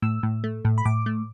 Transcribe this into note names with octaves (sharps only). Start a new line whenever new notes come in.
A2 E6
A2
A3
A2
B5
A2 D6
A3